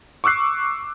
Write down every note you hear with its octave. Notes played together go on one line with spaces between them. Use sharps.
C#6 D6 E6 F#6 C7